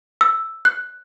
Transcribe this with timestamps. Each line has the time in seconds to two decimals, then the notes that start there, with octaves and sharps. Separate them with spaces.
0.21 E6
0.65 F#6